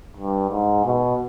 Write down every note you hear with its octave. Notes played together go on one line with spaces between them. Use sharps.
G2
G#2
B2